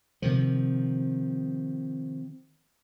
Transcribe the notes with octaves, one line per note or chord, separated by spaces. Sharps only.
C3 D#3 F3